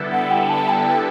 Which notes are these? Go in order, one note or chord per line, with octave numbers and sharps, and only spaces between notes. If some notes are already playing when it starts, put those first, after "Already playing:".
Already playing: D3 G3 B3 E4 A4
F#5
G5
A5
G5